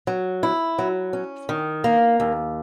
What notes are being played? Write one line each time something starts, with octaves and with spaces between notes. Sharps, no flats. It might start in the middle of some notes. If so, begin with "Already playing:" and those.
F#3
E4
F#3
C#4
D#3
A#3
D#2